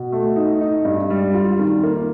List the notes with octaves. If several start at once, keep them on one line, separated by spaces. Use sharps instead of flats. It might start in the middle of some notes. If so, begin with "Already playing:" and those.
Already playing: B2
A3
D#4
D#4
G2
G3
F4
D#3
A#3